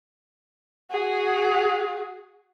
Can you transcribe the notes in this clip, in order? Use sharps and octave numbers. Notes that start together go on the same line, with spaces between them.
F#4 G#4